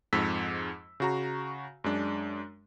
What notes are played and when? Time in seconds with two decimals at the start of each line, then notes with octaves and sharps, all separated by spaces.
0.13 F2 G#2 E6 B6
1.00 C#3 F#4 A#5
1.84 F#2 G#3 D4